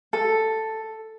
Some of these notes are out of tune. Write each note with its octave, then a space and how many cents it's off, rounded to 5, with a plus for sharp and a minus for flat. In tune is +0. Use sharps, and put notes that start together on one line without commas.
A4 +5